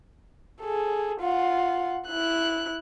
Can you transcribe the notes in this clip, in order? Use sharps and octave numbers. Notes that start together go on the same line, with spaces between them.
G#4 A4
F4 F#5
E4 F#6